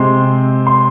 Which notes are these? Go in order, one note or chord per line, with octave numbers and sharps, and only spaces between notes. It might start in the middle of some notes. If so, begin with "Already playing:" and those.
Already playing: C3 G#3 C4 C6
C6